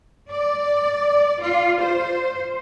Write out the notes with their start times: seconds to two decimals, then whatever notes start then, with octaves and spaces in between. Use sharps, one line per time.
0.31 D5
1.42 F4
1.81 C5